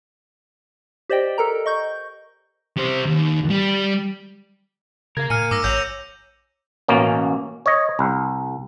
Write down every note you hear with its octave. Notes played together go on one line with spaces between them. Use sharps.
G4 C5 D5 D#5 G5
A4 A#4 A#5
D#5 C#6 G6
G3 C5
D#2
G3
C#3 A#4 F5 G#6
A#2 G#5 F6 C#7 D#7
G#2 D6 E6 A#6
A#1 C#5 F#5 G6 F7
A1 B2 A#3 C#4
C#5 D#5
C2